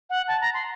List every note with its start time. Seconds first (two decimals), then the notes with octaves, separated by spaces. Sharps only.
0.10 F#5
0.28 A5
0.41 A#5
0.54 C6